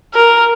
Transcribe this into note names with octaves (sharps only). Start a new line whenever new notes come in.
A#4